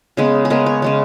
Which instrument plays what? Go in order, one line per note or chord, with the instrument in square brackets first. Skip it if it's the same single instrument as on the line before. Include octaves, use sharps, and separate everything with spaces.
[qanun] C#3 G#3 B3 G#4
G#4
C#3 G#3 B3 A#4
C#5
C#3 G#3 B3 C#5